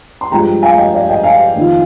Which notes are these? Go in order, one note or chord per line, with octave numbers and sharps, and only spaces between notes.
C6
G2 F3 G#3 G5 A#5
F5 G#5
D#5 G5
D5 F5
D#5 G5
F5 G#5
F2 D#3 A#3 F4